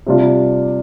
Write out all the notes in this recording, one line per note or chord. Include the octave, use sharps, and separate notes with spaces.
C3 G3 D4 F4